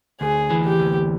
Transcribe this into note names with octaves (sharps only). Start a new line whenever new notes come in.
D2 G#4
E3
G4
D2